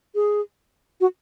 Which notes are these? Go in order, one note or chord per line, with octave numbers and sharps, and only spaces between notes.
G#4
F#4